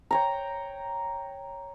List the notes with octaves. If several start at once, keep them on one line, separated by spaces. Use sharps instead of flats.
C#5 G5 A#5